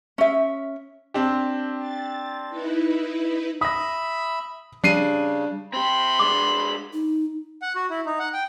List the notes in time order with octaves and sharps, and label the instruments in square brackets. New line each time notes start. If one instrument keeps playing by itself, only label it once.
[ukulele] C#4 E5
[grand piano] C4 D4 G4
[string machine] A6
D#4 E4 B4
[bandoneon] E5 B5 [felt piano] D#6 A#6
[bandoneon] C#3 [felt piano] G3 [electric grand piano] D4 C7 D#7
[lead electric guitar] C4 G4 [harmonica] B5 C6
[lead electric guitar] G#3 D4 [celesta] D6
[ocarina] D#4
[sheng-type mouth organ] F#5
F#4
E4
D#4
F#5
G5